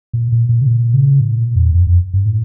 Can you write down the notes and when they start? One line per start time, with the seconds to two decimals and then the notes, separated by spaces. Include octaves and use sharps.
0.13 A#2
0.32 A#2
0.49 A#2
0.61 C#3
0.67 A#2
0.94 C#3
1.20 A2
1.38 A#2
1.56 E2
1.73 F2
1.87 F2
2.14 G2
2.26 A2